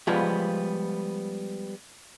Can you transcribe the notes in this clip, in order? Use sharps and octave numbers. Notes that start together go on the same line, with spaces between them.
F3 G3 G#3 B3 F4